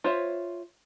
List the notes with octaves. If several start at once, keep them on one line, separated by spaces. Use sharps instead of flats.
F4 C5 C#5 E5